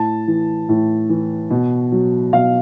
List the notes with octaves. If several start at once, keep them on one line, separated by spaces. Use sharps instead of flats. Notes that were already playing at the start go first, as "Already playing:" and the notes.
Already playing: A2 A5
E3
A2
E3
B2
F#3
B2 F5